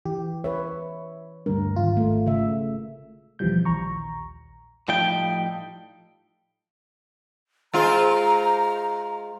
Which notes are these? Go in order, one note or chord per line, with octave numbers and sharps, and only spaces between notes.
E3 G4
B4 C#5 E5
D2 G2 A#4
G#1 F4
A3
C#3 A3 E5
D#2 B2 E3 F3 G3 G6
A#1 D#2 A#5 C#6
A2 F3 G3 D#4 G5
G#3 F4 C5 A#5